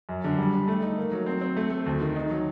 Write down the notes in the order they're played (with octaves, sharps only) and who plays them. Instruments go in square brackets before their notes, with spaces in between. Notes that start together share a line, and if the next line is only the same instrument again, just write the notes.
[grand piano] F#2
D3
G3
D3
A3
D#4
A#3
F#3
C4
C4
A3
A3
D2
D#3
D#4
F#3